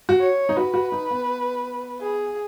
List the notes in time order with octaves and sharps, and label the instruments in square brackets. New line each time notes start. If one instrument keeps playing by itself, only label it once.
[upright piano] F#4
[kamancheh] C#5
[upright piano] D#4
[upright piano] F#4 [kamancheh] B4
[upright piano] F#4
D#4
B3
[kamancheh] G#4